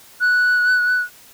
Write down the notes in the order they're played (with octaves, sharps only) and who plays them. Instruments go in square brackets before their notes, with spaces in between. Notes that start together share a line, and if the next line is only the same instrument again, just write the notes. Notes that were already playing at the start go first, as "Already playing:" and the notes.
[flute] F#6